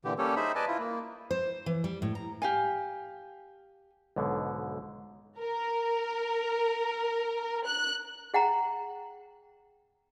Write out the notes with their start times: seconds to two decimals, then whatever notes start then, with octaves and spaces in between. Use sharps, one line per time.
0.05 A#2 D3 E3 G4
0.18 G3 A#3 C#4 G4 A4 C#5
0.36 D#4 G#4 C5 E5 B5
0.55 B4 D5 D#5 G#5 A5
0.68 E4 F4
0.79 A#3
1.31 C5
1.66 E3
1.84 G3
2.02 A2
2.15 A#5
2.42 G4 F5 G#5
4.16 B1 G#2 B2 D3
5.38 A#4
7.66 F#6
8.34 G#4 F#5 G5 A#5